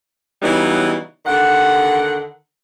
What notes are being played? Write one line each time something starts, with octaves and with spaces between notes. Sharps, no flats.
C#3 E3 F#3 G3 B3 D#4
D#2 D3 D#3 F#5